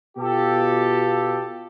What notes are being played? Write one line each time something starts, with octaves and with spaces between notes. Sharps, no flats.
B2 F4 G4 A4